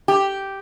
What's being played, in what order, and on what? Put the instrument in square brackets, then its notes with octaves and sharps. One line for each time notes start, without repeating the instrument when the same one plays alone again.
[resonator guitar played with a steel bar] G4